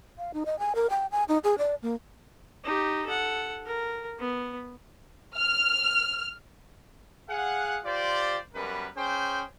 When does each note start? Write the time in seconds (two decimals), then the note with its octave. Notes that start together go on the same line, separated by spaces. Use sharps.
0.18 F5
0.34 D#4
0.46 D#5
0.59 G#5
0.75 A#4
0.90 G5
1.12 G#5
1.28 D#4
1.44 G#4
1.58 D5
1.82 A#3
2.64 D#4 G4
3.05 A4 F#5
3.66 A#4
4.19 B3
5.36 F6
7.28 G#4 F5 F#5
7.84 F4 G4 C5 D5
8.54 F#2 G3 B3 A#4 B4
8.96 C#4 G#4 C5 G5